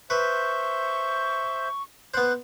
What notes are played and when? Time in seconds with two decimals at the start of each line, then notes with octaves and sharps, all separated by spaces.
0.10 B4 C5 E5 C#6 G6
2.14 B3 C5 F#6